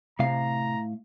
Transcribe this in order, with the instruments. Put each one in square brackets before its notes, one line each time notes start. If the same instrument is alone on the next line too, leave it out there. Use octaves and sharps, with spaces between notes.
[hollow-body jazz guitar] A2 F5 [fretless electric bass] C3 [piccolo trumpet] A#5